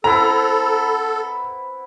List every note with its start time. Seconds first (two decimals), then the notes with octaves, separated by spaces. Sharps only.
0.04 B3 C4 E4 A4 A#5